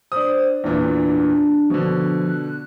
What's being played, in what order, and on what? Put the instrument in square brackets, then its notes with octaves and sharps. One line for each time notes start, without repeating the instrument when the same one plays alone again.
[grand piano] D4 D#6 [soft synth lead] C5
[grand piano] E2 A#2 E3 [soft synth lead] D4
[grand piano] B2 D3 [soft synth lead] F3
[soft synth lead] F#6